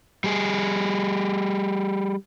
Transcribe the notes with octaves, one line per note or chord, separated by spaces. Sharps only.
G3 G#4